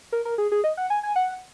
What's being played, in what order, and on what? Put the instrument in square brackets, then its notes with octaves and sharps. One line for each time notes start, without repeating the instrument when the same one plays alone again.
[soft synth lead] A#4
A#4
G#4
G#4
D#5
F#5
G#5
G#5
F#5